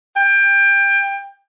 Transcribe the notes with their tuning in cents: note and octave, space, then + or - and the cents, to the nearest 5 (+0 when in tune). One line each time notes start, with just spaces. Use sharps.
G5 +25